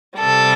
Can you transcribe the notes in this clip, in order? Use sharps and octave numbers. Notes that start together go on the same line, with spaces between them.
C3 G3 A4